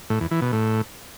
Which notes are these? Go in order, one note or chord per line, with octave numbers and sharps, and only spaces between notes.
A2
E2
E3
B2
A2